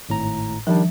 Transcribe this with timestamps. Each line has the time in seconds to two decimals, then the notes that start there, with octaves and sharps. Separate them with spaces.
0.09 G#1 A2 A#5
0.67 D#3 F3 G3 D4